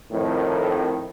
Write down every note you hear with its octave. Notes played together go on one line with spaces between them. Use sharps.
F2 A2 D#3